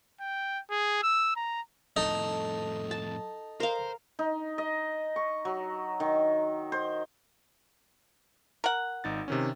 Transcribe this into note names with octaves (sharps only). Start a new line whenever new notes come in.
G5
G#4
E6
A#5
F2 A2 D#4 A4
A5
A#4 C5 F5
D#4
D#5
C#6
F#3
D#3
C5
A#4 F#5
G#1 D#4 A6
C3 D#3 C#4